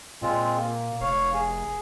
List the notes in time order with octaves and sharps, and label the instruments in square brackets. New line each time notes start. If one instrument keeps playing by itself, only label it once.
[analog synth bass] A#2 [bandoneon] G#3 C4 F4
[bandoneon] A#3
[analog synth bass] F1 [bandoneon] C#5 F5
[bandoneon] G#4